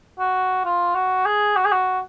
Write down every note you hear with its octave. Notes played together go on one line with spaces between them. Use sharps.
F#4
F4
F#4
G#4
F#4
G#4
F#4